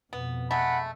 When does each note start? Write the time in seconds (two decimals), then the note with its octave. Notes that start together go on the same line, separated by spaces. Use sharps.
0.13 F2 B2 B3
0.51 G#3 A3 F#5 B5